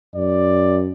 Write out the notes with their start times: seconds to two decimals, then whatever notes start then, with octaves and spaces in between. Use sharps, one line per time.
0.15 F#2 D5